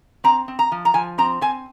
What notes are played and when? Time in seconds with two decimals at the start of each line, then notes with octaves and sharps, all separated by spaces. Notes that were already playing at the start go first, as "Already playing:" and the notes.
0.24 C4 A#5
0.48 C4
0.59 A#5
0.72 F3
0.85 A#5
0.94 F3 G#5
1.18 C4 A#5
1.41 C4 G#5